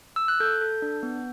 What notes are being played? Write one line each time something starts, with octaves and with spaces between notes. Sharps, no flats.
E6
F#6
A4 G6
A4
D4
B3